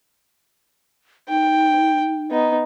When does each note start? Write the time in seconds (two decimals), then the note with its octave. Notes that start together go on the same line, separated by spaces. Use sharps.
1.29 D#4 G5
2.31 B3 D#4